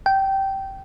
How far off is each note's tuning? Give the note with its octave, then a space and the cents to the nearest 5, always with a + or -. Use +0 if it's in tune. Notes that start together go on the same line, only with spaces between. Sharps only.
G5 -15